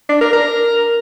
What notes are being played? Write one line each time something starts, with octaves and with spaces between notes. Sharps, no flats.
D4
A#4
A#4